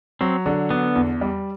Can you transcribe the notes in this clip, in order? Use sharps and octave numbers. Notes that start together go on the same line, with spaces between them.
F#3 C4
D3
B3 D4
E2
G3